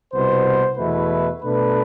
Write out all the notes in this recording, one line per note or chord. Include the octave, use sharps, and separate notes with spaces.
C2 B2 B3 C5
E2 B2 A3 E4 B4
B2 A3 D4 B4